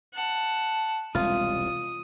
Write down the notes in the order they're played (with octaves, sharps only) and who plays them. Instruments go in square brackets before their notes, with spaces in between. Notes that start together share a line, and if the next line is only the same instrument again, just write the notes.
[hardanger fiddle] F#5 A5
[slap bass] E1 C2 G#3 [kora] F4 [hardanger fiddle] D#6